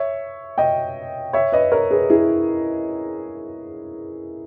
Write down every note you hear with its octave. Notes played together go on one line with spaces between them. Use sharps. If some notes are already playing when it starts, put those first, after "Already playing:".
Already playing: C#5 E5
D#5 G5
C#5 E5
B4 D#5
A#4 C#5
G#4 B4
E4 G#4